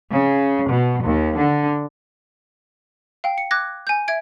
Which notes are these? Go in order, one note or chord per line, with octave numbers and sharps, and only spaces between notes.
C#3
B2
D#2
D3
F5 G5
C#7
D6 F#6 G#6 A#6
G#5 G6
E5 G#6 D7